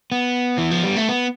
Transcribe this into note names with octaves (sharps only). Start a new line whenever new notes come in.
B3
E3
F3
G3
A3
B3